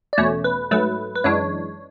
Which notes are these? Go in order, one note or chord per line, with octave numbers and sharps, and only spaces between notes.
D5
E2 B2 A3 C#4 C#5
B4
G#2 F#3 A3 B4
B4
F#2 E3 G#3 D4 C#5